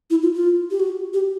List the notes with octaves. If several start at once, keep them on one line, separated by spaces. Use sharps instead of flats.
E4
F4
F4
G4
F#4
G4